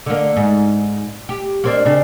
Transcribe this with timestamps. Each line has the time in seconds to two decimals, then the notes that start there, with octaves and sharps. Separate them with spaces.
0.06 D3 A#3
0.36 G#2
1.29 G4
1.64 A#3 C4 D4
1.85 C#3 C4 D4